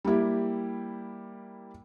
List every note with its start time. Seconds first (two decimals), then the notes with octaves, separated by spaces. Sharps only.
0.04 G3 A#3 E4 G4